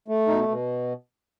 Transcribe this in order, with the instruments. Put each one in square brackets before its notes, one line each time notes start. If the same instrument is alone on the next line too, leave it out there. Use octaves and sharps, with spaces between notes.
[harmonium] A3
B2 D#4
B2